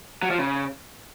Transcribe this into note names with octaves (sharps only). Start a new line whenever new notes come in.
F#3
F3
C#3